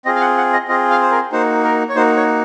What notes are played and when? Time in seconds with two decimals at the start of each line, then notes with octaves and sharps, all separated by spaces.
0.05 C4 F4 G#4 D#5
0.16 F5
0.21 F#5
0.37 F#5
0.53 D#5
0.68 C4 F4 G#4 D#5
0.90 F5
1.02 C5
1.11 A#4
1.32 A#3 D#4 F#4 C5
1.64 A#4
1.89 C#5
1.96 A#3 D#4 F#4 C5
2.17 C#5